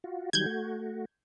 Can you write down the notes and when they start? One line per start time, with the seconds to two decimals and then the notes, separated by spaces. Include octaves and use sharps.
0.04 F4 F#4
0.33 D#3 F#3 G3 G6 G#6
0.46 A3 F#4